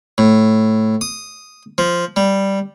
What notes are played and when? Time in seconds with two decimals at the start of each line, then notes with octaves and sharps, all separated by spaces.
0.18 A2
1.01 D#6
1.78 F3
2.16 G3